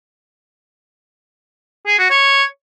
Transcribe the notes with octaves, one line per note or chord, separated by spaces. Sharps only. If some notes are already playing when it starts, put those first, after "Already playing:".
G#4
F#4
C#5